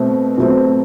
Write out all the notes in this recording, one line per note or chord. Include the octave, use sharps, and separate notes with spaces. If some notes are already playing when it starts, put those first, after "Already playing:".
Already playing: B2 A3 C4
B2 F#3 A3 C4